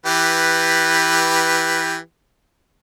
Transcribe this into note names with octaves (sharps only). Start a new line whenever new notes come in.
E3 G4 B4